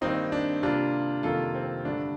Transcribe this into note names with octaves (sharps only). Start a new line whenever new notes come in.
G2 D#3 A#3 C4 D#4
D4
C3 G3 A#3 D4 F4
F2 C3 D#3 G3 A#3 F4 A4
C4
G2 D3 A3 D4